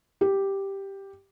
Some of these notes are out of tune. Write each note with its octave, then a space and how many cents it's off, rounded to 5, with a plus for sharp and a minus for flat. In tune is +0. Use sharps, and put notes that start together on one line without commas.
G4 +0